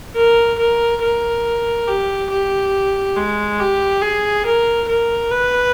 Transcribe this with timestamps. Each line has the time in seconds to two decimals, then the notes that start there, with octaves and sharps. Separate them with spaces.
0.16 A#4
0.59 A#4
1.02 A#4
1.88 G4
2.30 G4
3.16 G#3
3.59 G4
4.02 G#4
4.46 A#4
4.88 A#4
5.30 B4